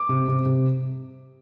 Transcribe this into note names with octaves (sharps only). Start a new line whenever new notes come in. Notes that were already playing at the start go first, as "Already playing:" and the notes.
Already playing: D6
C3
C3
C3